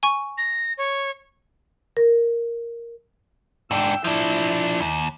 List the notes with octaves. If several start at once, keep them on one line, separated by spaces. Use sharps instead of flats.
G#5 C#6
A#6
C#5
A#4
G#2 D4 G5 E6
F3 D4 E4
D#2